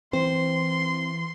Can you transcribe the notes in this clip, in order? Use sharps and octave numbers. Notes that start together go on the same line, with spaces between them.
E3 C4 C5 C6